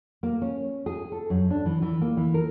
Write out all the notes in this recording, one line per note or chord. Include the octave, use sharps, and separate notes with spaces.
A#3
C#4
G#4
A4
F#2
D4
E3
E3
A#3
E3
A#4